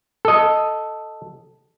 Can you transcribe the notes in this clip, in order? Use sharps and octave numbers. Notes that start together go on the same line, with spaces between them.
A4 D#5